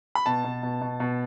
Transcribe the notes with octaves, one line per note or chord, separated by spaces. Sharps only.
B5
B2 A5
B2
B2
B2
B2